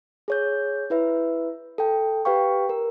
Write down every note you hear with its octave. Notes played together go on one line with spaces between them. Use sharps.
G#4 C#5 G6
E4 B4 E5
A4 G5
G4 B4 F5 G5 C#6
A#4